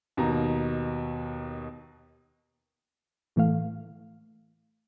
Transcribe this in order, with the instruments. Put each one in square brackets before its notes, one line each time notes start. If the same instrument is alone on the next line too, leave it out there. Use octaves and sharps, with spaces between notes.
[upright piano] D#2 B2 A#5
[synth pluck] A2 E3 A3 F5